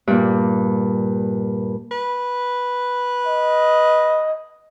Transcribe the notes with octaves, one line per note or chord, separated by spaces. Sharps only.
G2 A#2
B4
D#5